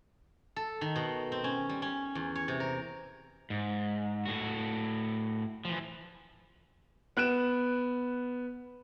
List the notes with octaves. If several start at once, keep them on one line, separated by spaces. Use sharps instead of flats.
A4
D#3
B2
C4
C#4
G3
C#4
E2
C#5
C3
A#4
G#2
A2 F#4
E3 F3
B3 F#6 D7 E7